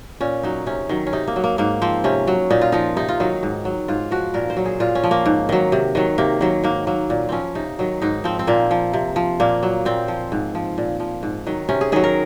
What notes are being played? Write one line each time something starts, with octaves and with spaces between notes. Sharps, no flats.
A#2 C#4
F#3 D#4
C3 C#4
D#3 F#3
C#4
C3 D#4
A#3
F#3
A#3
G#2 A#3
F3 C4
C3 C#4
F#3
A#2 D#4
F4
F3 D#4
C3 D#4
F4
D#3 F#3 D#4
G#2
F#3
G#2 F4
F3 F#4
A#2 A#4
C5
F#3
G#4
A#2 F4
C#4
F3
A#3
G#2
D#3 F#3
C3
D#3 F#3
C3 A#3
D#3 F#3
G#2 A#3
F#3 A#3
A#2
F3 C4 C#4
C3 D#4
D#3 F#3
G#2 D#4
F3 C4
C4
A#2 A#3
F3
C3
F3
A#2 A#3
F#3
A#2 C4
F3
G#2
F3
A#2
F3
G#2
D#3 F#3
C3 C#4
G#4
D#3 F#3 G#4
A#4